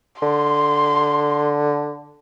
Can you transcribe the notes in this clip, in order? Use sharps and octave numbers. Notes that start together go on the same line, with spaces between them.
D3 C6